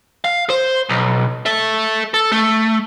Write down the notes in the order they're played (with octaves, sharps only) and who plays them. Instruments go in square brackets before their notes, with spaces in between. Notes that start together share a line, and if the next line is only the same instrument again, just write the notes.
[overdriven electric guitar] F5
C5
B1
A4 E5
A4
A3